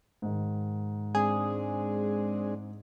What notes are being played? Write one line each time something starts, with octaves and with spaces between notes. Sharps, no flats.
G#2 D#3
G#3 C4 D4 G#4